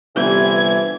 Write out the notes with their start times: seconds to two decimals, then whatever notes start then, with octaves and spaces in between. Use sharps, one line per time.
0.16 G1 C3 E3 G#6